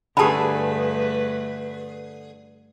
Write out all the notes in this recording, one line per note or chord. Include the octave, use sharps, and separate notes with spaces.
G2 D3 A3 G4 G#4 B4 A5 B5